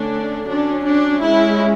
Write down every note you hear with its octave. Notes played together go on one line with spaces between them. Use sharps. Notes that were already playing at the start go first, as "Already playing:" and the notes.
Already playing: D3 A3 C#4 D4
F#3 C#4 D4
D4
G#3 C#4 E4